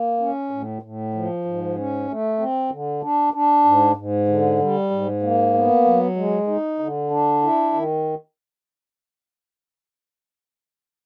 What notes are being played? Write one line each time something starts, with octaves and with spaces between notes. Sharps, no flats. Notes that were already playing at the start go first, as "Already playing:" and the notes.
Already playing: A#3
C#4
A2
A2
F3
G#2
C#4
A3
C4
D3
D4
D4
G#2
G#2
D3
G3
G#2
A#3
B3
F#3
G#3
D#4
D3
D4
E4
D#3